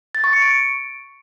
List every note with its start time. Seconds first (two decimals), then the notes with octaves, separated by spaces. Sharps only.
0.15 A6
0.24 C#6
0.33 C#7
0.42 D7